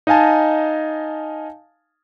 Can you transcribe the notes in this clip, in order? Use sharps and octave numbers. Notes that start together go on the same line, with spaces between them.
D#4 D#5 F5 G#5 A5